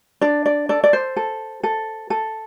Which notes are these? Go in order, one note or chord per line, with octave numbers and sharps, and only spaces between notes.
D4 D5
D5
A4 D5
D5
C5
A4
A4
A4